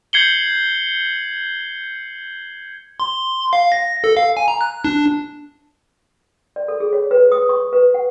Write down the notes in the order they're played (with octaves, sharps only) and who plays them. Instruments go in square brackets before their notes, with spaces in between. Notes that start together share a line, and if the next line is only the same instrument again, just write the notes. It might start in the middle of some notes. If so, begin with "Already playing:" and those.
[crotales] G6 G#6 C7 C#7 F#7 G7
[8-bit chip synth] C6
F5
A#6
A4
F5
G#5
A#5
F#6
D4
[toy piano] D5
A4
G#4
C#5
B4
D#6
C#6
B4
F#5